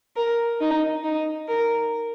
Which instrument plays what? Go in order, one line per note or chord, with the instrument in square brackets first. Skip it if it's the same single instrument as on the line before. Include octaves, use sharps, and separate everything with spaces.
[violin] A#4
D#4
D#4
A#4